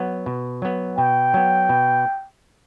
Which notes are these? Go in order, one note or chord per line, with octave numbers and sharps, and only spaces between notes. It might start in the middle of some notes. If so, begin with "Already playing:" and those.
Already playing: F#3 B3
B2
F#3 B3
B2 G5
F#3 B3
B2